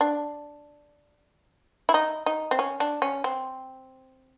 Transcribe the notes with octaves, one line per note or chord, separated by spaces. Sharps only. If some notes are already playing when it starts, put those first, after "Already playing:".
D4
E4
D#4
D#4
C4
C#4
D4
C#4
C4